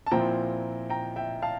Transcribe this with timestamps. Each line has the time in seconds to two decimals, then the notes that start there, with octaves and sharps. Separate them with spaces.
0.06 A5
0.11 A#2 F3 C4 E4 G5 A#5
0.90 G5 A#5
1.16 E5 G5
1.42 F5 A5